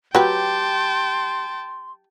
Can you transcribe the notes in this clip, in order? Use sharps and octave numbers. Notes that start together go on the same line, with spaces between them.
F#3 G4 B4 G5 A5 C6